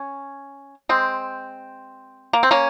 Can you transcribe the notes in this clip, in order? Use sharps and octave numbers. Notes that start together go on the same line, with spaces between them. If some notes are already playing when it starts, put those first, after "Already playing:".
Already playing: C#4
G#3 C4
A#3
C4
A#3 C#4